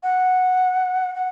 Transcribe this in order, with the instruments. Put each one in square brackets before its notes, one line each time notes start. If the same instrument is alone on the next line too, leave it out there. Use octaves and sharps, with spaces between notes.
[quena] F#5
F#5